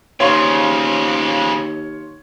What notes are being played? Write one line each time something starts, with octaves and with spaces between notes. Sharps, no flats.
D#2 C#3 F3 C#5 F5 C6